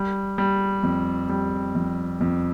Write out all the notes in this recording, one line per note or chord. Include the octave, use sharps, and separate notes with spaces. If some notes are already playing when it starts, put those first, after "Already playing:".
Already playing: G3
G3
F2
G3
F2
F2